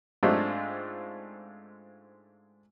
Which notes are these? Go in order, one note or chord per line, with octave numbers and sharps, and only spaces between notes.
G#2 G#3 A3 C4 D4 F4